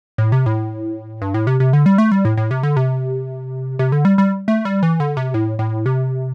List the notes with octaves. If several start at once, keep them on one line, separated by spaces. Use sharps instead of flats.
A2
C3
A2
G2
A2
C3
C3
D3
G3
A3
G3
A2
A2
C3
D3
C3
C3
D3
G3
G3
A3
G3
E3
D3
C3
A2
A2
C3